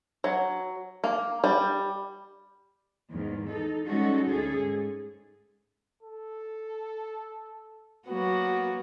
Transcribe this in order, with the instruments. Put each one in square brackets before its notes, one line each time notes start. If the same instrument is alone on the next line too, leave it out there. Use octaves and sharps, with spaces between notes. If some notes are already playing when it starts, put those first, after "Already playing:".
[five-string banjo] F#3
A#3
G3
[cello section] E2 G#2 D#3
D#4 A4
G3 G#3 C#4 D#4 F#4 A4
D2 C#4 G#4 A4
G#2
[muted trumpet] A4
[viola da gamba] F#3 A#3 F#4 [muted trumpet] B3